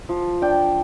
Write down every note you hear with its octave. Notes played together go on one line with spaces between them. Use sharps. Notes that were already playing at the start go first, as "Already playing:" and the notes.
F3
D4 G5